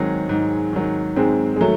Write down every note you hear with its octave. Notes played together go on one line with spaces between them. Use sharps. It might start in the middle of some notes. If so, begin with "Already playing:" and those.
Already playing: G#2 D#3 F#3 G#3 C4
G#2
D#3 F#3
G#2 G#3 C4
G#3
D#3 F#3 A3